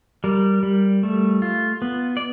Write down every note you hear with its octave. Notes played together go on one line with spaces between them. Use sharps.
G3 A#4
G3
A3
F4
B3
D5